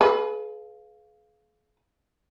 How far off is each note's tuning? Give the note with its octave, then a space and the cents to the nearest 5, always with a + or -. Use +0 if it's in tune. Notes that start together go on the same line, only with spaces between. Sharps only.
G#4 +40 B4 +0 F5 +0